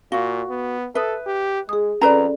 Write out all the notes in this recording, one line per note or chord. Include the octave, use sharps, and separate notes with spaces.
A#2 F#4 F5
B3
A4 B4 E5 D#6
G4
G#3 G#4 D#6
F2 C#4 A4 B4 D5 A#5